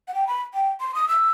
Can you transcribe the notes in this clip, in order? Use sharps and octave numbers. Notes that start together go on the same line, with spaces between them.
F#5
G5
B5
G5
C6
D#6
E6